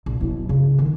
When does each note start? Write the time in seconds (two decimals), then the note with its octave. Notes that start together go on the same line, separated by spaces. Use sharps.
0.06 A#1
0.20 B1 E4
0.49 C#3
0.78 D#3